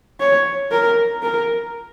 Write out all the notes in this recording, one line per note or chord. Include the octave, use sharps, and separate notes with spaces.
C#5
A#4
A#4